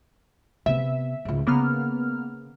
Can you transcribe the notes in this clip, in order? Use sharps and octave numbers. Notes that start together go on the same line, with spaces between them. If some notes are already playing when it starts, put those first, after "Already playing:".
C3 B3 E5
C#2 G#2
C#3 A#3 B3 F6